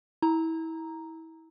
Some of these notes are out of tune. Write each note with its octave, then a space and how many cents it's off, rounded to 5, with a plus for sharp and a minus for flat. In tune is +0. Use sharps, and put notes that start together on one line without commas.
E4 -25 A#5 +0